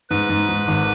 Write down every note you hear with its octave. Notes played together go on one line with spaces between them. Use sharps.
G#2 B4
G#2
G#2
G#1